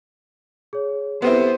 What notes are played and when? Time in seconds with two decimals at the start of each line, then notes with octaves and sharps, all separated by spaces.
0.73 G#4 C#5
1.22 B3 C4 E4 G4 A4 B4 C5